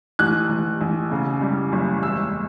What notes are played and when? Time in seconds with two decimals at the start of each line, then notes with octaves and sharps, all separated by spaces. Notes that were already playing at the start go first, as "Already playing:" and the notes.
0.19 A1 F#6
0.50 A1
0.81 A1
1.11 C#3
1.41 G3
1.72 F#1
2.03 E1 E6